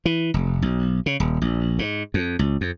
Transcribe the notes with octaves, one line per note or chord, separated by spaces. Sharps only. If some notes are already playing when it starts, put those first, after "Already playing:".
E3
F1
B1
C#3
D#1
A#1
G#2
F2
C#2
F2